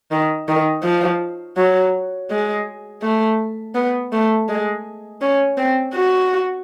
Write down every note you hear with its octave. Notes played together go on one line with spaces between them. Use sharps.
D#3
D#3
F3
F#3
G#3
A3
B3
A3
G#3
C#4
C4
F#4